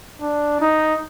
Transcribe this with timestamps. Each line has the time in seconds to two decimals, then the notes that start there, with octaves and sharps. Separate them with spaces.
0.21 D4
0.61 D#4